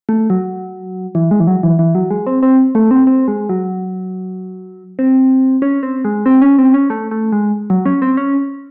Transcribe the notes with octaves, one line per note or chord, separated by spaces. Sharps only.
A3
F#3
E3
G#3
E3
F#3
E3
E3
F#3
G#3
C4
C4
A3
C4
C4
G#3
F#3
C4
C#4
C4
G#3
C4
C#4
C4
C#4
A3
A3
G#3
F#3
C#4
C4
C#4